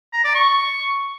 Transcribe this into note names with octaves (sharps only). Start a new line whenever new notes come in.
A#5
D5
C#6